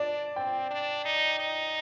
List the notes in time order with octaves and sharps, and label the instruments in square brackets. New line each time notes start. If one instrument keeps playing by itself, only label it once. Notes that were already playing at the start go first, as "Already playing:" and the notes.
Already playing: [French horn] D4 [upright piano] D5
[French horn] C4 [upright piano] G5
[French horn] D4
D#4
D#4